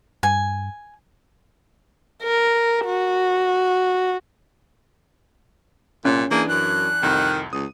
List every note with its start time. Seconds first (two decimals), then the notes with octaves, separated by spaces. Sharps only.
0.23 G2 G#5
2.23 A#4
2.85 F#4
6.05 C2 A#2 C#4
6.31 E3 A#3 D4 G#4 D7
6.49 F#2 F#6
7.03 C2 F2 D#3
7.53 C#2 D#6